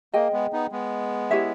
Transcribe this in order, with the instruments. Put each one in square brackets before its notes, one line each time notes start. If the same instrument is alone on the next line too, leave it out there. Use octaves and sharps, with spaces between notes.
[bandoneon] A#3 [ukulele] G#4 D#5 G5
[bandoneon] G#3 B3
B3 D#4
G#3 B3
[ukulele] E4 G4 C#5 E5